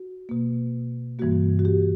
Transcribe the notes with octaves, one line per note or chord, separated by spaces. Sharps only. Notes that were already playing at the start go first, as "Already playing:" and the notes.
Already playing: F#4
B2 A#3
G2 E3 G3 A#3 F#4
F#4
G4